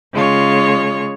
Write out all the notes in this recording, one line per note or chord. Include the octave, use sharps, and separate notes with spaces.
C#3 G#3 F4 C#5